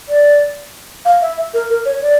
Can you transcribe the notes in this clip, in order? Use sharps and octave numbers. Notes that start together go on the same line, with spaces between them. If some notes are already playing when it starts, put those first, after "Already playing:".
D5
F5
E5
E5
A#4
A#4
C#5
D5